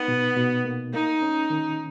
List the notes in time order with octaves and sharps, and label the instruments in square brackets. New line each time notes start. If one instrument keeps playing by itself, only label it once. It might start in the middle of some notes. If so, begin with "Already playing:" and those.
Already playing: [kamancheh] B3 [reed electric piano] D#4
[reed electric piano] B2
B2
A#3
[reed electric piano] A#3 [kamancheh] D#4
[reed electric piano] C#4
D#3